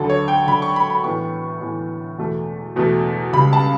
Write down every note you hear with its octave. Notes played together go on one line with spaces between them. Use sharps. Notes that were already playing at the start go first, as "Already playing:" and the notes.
Already playing: D2 D3 F#3 A4
C#5
G5
D2 D3 F#3 B5
C#6
B5
B5
A2 E3 B3 C#6
A2 E3 B3
E2 B2 A3
E2 B2 A3
C#2 C#3 G3 B5
A5